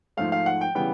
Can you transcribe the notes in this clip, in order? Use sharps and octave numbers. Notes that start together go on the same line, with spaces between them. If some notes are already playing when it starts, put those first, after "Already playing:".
G#2 F3 A3 F5
F5
F#5
G5
C#3 E3 G3 B3 G5